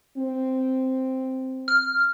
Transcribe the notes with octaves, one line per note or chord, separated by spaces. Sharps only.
C4
F6